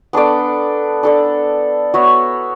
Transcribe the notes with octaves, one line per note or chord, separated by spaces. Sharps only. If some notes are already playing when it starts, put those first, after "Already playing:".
B3 D4 A4 D5
D4 A4 D5
B3 F#4 C#5 E5